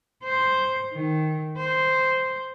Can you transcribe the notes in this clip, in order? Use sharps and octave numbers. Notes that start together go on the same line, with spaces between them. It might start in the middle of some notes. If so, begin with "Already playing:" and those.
C5
D#3
C5